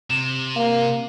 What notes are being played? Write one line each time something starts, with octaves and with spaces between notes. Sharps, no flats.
C3 E7
A#3 F5